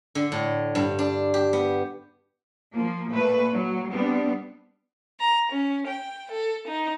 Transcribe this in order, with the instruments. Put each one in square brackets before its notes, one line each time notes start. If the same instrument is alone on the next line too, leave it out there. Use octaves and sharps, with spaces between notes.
[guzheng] D3
A2
G2
D4
G4
B3
[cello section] F3 A#3
A#2 A3 B4
F#3
G3 B3 C4 D4
[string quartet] A#5
C#4
G5
A4
D#4